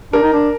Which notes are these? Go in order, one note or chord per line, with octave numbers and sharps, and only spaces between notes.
D4 A#4
D#4
D4